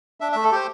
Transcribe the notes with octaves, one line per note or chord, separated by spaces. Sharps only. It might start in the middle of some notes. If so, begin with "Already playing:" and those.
D4 E5
A3 E5
A4
G4 C5